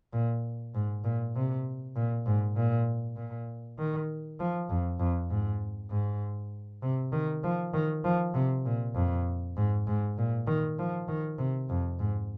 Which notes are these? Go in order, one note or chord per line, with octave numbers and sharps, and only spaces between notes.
A#2
G#2
A#2
C3
A#2
G#2
A#2
A#2
D#3
F3
F2
F2
G#2
G#2
C3
D#3
F3
D#3
F3
C3
A#2
F2
G#2
G#2
A#2
D#3
F3
D#3
C3
F2
G#2